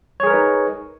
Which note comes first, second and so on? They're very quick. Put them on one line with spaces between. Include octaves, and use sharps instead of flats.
C#5 G#4 A#4 B4 D#4